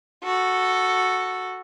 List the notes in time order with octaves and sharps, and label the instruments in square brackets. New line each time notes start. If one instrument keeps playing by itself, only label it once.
[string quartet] F#4 A4